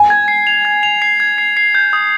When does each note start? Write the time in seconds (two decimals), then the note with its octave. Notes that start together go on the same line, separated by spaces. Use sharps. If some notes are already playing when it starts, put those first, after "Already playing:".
Already playing: G#5
0.10 G#6
0.28 C7
0.47 F7
0.65 G#6
0.83 F7
1.02 C7
1.20 G#6
1.38 C7
1.57 C7
1.75 G6
1.93 D#6